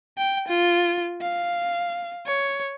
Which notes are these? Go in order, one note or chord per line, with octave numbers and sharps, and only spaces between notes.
G5
F4
F5
C#5